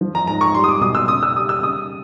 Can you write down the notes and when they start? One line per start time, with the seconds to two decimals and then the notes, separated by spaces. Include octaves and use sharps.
0.01 F3
0.15 A#5
0.27 G#2 A#5
0.41 C#6
0.55 G3 C6
0.64 D#6
0.69 D6
0.81 B2 D#6
0.95 E6
1.08 C#3 D#6
1.23 E6
1.36 G3 D#6
1.49 E6
1.62 C#3 D#6